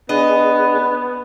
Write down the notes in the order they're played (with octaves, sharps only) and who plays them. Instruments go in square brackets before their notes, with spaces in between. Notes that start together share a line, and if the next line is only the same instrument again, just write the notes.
[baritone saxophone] B3 [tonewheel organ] D4 G#4 [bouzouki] D#5